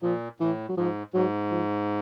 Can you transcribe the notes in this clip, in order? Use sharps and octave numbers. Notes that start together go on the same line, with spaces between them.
A#2 F3
A2 E3
F#3
G#2 F3
G#2 F#3
F3